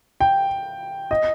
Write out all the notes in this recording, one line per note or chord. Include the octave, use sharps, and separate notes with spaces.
G5
D#5